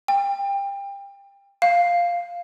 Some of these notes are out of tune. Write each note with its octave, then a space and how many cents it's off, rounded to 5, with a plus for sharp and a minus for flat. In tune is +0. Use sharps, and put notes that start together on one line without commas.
G5 +25
F5 +0